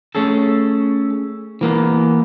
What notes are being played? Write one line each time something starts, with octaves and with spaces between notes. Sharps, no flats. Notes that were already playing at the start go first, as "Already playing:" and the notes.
A3 C#4 G#4 A4
E3 A#3 B3